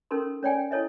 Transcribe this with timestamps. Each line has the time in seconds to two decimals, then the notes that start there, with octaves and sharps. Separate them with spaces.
0.11 C#4 D#4 A4 A#4 C6
0.43 C#4 C#5 D5 G5 G#5
0.71 E4 A4 C#5 D#5 E5